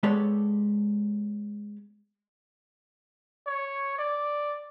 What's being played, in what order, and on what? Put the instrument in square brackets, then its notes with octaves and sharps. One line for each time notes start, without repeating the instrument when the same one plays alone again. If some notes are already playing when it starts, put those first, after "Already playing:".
[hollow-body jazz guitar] G#3 B3 G4 A4 C#5 D5
[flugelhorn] C#5
D5